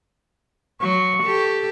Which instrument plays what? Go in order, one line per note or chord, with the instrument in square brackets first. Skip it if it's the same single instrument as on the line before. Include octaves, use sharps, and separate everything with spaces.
[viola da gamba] F#3 [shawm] C#6
[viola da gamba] G4 A4